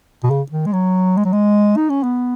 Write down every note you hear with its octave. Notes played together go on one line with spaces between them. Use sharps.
B2
C#3
D#3
G#3
F#3
G#3
F#3
G#3
D#4
C#4
B3